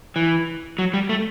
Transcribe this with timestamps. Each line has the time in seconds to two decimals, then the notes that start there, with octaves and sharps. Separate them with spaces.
0.16 E3
0.79 F#3
0.94 G3
1.09 A3